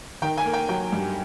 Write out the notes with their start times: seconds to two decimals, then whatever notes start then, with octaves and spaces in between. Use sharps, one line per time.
0.22 D#3 G5
0.38 G#5
0.45 A#3
0.53 G5
0.69 F#3 G5
0.92 G2